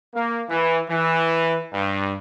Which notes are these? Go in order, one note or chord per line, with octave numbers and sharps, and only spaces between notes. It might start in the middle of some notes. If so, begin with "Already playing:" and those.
A#3
E3
E3
G2